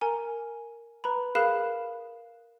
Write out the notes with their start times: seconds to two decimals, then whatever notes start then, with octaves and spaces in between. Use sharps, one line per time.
0.01 A#4 G#5 A#5
1.04 B4 A#5 B5
1.35 G#4 A#4 F5 B5 F#6 E7